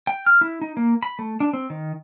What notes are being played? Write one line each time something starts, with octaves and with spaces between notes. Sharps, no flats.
G5
F6
E4
D#4
A#3
B5
A3
D4
C4
D#3